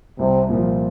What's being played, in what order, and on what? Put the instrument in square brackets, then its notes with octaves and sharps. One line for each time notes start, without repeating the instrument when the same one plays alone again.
[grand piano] C2 [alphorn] C3
[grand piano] A#2 F3